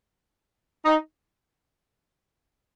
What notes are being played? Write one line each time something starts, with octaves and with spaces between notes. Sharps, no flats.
D#4